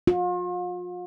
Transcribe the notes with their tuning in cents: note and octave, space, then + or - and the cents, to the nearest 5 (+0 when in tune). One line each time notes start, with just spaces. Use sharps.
F4 +40